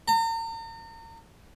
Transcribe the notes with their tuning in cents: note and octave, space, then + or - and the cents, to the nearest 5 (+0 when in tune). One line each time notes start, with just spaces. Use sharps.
A#5 -40